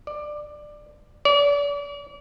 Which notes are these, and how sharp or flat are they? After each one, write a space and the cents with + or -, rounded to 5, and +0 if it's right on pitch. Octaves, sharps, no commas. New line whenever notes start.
D5 +15
D5 -40